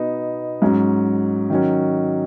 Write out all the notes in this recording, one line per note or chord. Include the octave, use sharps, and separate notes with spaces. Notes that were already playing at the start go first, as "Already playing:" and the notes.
Already playing: B2 B3 D#4
G#2 F#3 C#4
D#3 F#3 C#4